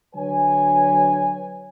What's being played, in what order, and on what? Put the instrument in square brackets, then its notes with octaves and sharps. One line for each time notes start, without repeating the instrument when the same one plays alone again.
[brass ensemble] D3 F#3 B4 C#5 G#5